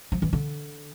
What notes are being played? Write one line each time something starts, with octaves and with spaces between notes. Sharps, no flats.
F3
E3
D3